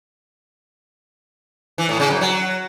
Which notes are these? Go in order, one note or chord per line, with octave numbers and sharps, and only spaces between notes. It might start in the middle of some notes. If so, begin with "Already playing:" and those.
E3
A2
C#3
F#2
F#3